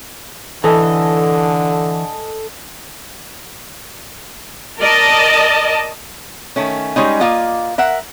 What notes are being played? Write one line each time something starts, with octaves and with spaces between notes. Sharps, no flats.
D3 E3 A4 D#5 G#5
A#4 D5 D#5 A5
D#3 A3 C#4
G3 G#3 C#4 D#4
A#3 F4 D#5
A#4 E5 F#5